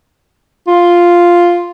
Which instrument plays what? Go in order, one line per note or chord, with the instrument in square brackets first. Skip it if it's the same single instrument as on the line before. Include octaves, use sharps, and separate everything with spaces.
[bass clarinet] F4